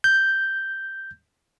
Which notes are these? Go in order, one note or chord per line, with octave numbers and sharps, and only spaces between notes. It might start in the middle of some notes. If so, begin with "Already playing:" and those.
G6